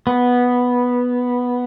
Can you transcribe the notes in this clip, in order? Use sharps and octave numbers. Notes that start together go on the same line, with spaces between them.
B3